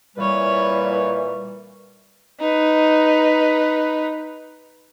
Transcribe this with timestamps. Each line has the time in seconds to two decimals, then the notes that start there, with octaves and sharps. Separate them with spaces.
0.17 A#2 E3 G3 B4 C#5
2.40 D#4 B4